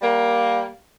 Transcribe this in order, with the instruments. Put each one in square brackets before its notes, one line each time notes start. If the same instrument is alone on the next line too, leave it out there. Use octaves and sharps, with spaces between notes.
[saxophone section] G3 A#3